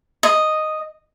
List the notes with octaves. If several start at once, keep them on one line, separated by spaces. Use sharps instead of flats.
D#5